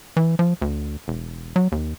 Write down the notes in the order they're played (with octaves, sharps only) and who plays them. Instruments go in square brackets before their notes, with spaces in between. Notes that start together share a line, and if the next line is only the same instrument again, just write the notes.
[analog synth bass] E3
F3
D2
E1
F#3
D#2